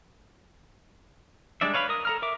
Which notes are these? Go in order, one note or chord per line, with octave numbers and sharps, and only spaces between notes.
G3 G#3 D4 D5 E5
B4 C#5 F5 G#5 B5
A#4 D#6
A4 A#5 F6
A#4 E5 D6